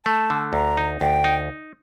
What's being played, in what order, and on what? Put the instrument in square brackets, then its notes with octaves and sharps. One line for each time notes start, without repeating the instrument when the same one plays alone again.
[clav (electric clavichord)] A3 [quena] A5
[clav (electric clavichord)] D3
[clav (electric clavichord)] D2 [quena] A#5
[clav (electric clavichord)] D#4
[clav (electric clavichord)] D2 [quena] G5
[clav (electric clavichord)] D#4